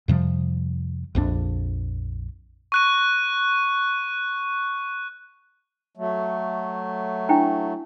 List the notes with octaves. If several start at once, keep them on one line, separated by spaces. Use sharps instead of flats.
F2 C3 F3 G3
A#1 F2 D#3 D4
C#6 F#6 D#7
F#3 A3
D4 E4 G5